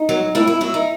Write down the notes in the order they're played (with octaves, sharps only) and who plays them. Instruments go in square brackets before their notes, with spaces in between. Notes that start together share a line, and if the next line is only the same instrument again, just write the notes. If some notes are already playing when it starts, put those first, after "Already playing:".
Already playing: [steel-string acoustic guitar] D#4
F#3
A2 E4
E4
F#3 E4
D#4